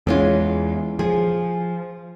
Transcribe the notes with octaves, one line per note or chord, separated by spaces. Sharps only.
E2 G#3 C#4 F4
F3 G#4